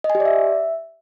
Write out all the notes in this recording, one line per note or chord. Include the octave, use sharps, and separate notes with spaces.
D#5
G#5
G4
D5
E5